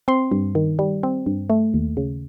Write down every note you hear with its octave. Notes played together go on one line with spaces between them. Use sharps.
C4 C6
G2
D#3
G3
C4
G2
A3
D#2
C#3